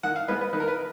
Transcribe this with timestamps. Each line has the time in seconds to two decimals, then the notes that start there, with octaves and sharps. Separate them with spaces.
0.03 D#3 F#5
0.16 F5
0.28 G#3 B3 B4
0.41 B4
0.53 D#3 B4
0.60 A#4
0.68 B4